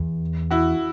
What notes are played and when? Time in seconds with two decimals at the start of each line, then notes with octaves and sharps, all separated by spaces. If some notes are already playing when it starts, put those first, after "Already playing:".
Already playing: E2
0.51 E4 F#4